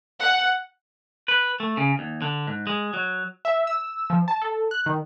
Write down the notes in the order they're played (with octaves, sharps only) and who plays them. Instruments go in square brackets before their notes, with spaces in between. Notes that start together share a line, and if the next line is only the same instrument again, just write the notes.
[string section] F#5
[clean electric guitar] B4
A3
C#3
D#2
D3
G#2
G#3
F#3
[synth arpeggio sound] E5
E6
F3
A5
A4
F#6
D#3